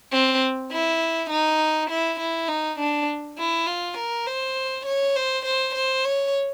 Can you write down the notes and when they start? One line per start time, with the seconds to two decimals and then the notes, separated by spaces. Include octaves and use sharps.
0.12 C4
0.71 E4
1.30 D#4
1.90 E4
2.20 E4
2.48 D#4
2.79 D4
3.38 E4
3.67 F4
3.97 A#4
4.27 C5
4.86 C#5
5.16 C5
5.45 C5
5.75 C5
6.05 C#5